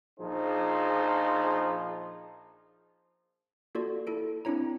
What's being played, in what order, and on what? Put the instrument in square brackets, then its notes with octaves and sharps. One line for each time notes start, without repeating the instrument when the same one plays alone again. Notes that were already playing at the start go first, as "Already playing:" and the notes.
[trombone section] A#1 F3 D#4 G#4 C5
[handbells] A#3 F4 F#4 A4 D5
E4 A4 D7
C4 D4 E4 C#5 A#5